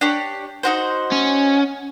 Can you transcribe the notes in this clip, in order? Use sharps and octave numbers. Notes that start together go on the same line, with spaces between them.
D4 G4 C#5
D#4 F#4 C5
C#4